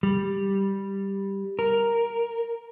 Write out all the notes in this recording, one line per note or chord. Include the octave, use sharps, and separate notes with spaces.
G3
A#4